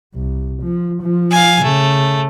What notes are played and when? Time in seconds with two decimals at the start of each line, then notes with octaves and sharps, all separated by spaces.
0.15 C2
0.63 F3
1.03 F3
1.31 F5 G#5
1.64 C#3 A3